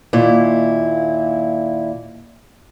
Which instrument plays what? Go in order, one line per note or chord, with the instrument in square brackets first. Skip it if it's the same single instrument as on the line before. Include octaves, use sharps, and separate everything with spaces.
[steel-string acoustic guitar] D#2 A#2 E4